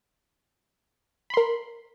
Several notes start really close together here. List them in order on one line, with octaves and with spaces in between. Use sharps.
B5 C6 A#4